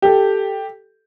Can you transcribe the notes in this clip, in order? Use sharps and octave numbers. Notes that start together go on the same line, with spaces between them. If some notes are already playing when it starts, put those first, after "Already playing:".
G4 A4